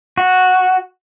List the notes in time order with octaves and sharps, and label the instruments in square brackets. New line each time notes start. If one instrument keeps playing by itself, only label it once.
[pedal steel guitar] F#4